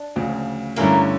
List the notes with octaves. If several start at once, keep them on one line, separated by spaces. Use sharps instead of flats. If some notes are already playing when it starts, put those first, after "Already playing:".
Already playing: D4
D2 C#3 F3
G2 D3 A3 A#3 C#4 E4 A#4